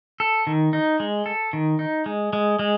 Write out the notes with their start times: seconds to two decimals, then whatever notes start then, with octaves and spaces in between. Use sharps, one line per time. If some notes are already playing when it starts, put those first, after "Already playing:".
0.20 A4
0.47 D#3
0.73 D#4
1.00 G#3
1.26 A4
1.53 D#3
1.79 D#4
2.06 G#3
2.33 G#3
2.59 G#3